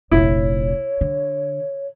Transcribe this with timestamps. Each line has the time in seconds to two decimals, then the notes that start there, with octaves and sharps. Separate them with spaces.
0.11 F1 A#1 E4 C#5
1.01 D3